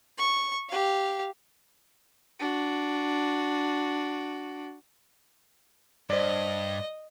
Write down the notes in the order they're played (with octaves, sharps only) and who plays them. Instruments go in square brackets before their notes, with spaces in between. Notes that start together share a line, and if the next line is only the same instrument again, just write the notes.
[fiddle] C#6
G4 F5
[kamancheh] D4 F#4
[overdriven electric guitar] G2 [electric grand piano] C5 D5 [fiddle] D#5